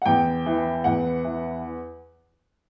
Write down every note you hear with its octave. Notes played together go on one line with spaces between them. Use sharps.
F#5
E2 G5
E3
E2 F#5
E3